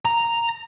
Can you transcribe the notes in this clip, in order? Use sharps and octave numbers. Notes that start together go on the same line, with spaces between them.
A#5